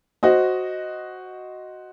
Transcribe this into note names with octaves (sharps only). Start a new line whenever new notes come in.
F#4 C5 D#5